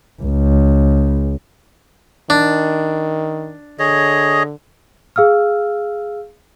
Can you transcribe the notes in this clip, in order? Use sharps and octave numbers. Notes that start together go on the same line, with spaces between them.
C#2
D#3 D4
D3 G#4 C#5 D#5
G#4 F5 E6 F6